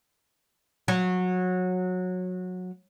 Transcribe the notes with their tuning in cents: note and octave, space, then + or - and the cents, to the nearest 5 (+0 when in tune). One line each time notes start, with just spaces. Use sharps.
F#3 -20